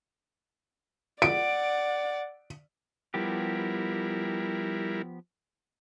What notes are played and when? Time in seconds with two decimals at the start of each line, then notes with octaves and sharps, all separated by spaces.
1.22 D5 F#5 D7
3.14 F3 G3 B3 E4 G4 A#4